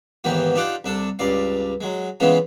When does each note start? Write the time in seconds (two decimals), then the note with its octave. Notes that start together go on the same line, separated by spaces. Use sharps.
0.24 D#2 G#2 E3 B3 G4
0.55 D4 D#4 F4 G4 F#5 D6
0.84 C2 D4 A4
1.19 C#2 G2 D5 F5
1.81 F#3 G#3
2.20 C#3 E3 G#3 B3 C#4 F4